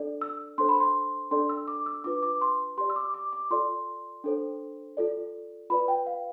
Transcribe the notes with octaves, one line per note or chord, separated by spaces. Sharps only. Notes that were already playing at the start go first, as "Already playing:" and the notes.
Already playing: D4 A4 D5
E6
D4 A4 C5 C6
B5
C6
D4 A4 D5 C6
E6
D6
E6
D4 F4 B4 D6
D6
C6
G4 D5 C6
E6
D6
D6
D6
F4 A4 D5 C6
D4 A4 C5
F4 A4 D5
F4 B4 D5 B5
G5
F5